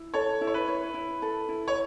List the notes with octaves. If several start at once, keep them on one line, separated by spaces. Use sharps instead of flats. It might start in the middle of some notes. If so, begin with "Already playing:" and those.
Already playing: E4
A4 C#5
E4
C#5
B4
C#5
E4
A4
E4
C#5